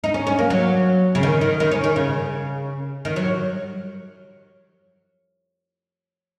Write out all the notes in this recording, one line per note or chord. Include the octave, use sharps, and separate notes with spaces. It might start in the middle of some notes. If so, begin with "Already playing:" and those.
D#4
C#4
C#4
A#3
F#3
C#3
D#3
D#3
D#3
C#4
D#3
C#3
D#3
F#3